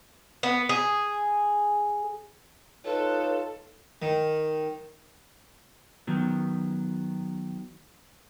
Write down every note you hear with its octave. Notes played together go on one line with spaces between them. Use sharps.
B3
G#4
D#4 F4 A4 B4 C#5
D#3
D#3 F#3 B3